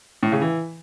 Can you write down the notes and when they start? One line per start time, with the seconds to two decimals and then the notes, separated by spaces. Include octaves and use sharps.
0.23 A2
0.32 C#3
0.41 E3